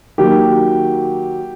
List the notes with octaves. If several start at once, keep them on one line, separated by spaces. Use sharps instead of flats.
D#3 F#3 A#3 G4